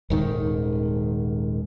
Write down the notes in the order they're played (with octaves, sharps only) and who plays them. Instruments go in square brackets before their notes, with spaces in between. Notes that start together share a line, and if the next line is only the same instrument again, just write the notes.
[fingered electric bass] D#1 G#2 D#3